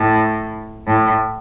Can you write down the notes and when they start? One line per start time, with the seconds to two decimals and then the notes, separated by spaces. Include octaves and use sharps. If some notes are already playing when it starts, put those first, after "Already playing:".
Already playing: A2
0.86 A2